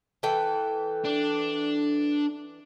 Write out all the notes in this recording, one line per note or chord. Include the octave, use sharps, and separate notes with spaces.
E3 A4 G5
D4